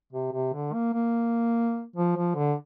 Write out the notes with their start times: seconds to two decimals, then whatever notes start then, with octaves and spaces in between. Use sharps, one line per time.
0.13 C3
0.32 C3
0.54 D3
0.74 A#3
0.94 A#3
1.96 F3
2.17 F3
2.36 D3